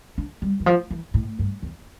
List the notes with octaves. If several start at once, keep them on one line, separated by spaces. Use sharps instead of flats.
D4
G3
E3
F3
E3
A2
G2
E2